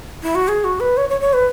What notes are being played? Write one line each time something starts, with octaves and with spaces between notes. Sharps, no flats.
E4
F#4
G#4
F#4
B4
C#5
C#5
C#5
B4